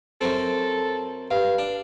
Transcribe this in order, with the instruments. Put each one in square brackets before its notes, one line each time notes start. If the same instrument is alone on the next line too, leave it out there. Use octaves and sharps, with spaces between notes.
[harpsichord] F#2 F#3 C4 [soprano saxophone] A4
[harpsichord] G2 [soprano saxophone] F5
[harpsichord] D4